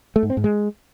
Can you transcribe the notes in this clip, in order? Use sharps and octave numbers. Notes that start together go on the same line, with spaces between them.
A3
G#2
C4
G#2
G#3